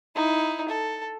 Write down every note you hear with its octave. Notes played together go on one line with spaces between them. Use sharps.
D#4 E4
A4